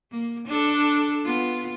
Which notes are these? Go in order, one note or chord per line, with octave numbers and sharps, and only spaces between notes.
A#3
D4 A4
B3 F4